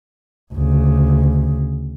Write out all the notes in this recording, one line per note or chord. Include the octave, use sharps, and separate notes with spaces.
D2 C#3